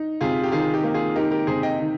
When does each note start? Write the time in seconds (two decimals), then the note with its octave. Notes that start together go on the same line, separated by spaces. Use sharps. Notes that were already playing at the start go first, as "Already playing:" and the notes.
Already playing: D#4
0.21 C3 F4 G#4
0.43 G4
0.52 D#3 F4 G#4
0.74 D#4 G4
0.84 A#3
0.94 F4 G#4
1.16 D#4 G4 A#4
1.31 G4 A#4
1.47 C3 G#4 C5
1.63 D#5 G5
1.79 D#3